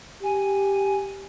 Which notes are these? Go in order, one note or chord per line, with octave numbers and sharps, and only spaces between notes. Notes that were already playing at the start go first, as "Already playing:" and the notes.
G4 G#5